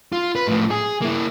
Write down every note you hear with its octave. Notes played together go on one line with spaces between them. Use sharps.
F4
B4
A2 F3
G#4
A#3 E4